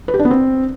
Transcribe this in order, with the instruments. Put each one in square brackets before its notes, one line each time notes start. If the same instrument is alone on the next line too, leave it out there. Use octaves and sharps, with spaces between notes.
[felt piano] B4
G4
D4
B3
C4